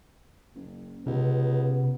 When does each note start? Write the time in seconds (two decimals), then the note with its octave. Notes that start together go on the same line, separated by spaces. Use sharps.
0.55 F#1
1.06 C#2 C3 B3